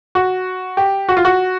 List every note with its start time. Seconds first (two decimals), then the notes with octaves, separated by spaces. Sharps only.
0.15 F#4
0.77 G4
1.09 F#4
1.17 F4
1.25 F#4